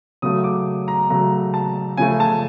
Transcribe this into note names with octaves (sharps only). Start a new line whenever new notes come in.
C#3 F#3 A3 D#6
D6
A#5
C#3 F#3 A3 A#5
A5
C#3 F3 A3 G#5
A5